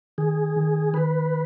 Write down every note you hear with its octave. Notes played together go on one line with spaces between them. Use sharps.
D#3 G#4
D#3
D#3 B4